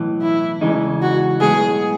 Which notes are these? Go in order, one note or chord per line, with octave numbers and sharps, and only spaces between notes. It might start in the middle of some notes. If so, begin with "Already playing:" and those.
Already playing: B1 A2 E3
E4
E2 C#3 E3 G#3 D#4
F#4
B1 A2 G#3 B3 G#4